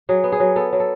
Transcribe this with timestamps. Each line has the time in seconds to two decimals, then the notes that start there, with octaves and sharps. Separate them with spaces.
0.09 F#3 G#4
0.24 B3
0.32 G#4
0.40 F#3
0.56 B3 A4
0.73 F#3
0.80 A4